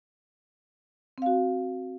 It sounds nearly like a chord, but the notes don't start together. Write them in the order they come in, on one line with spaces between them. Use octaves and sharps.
C4 F5 F#4